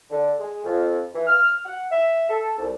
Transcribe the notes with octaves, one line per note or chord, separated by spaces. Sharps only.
D3
G#3
F2
E3
F6
F#5
E5
A4
C2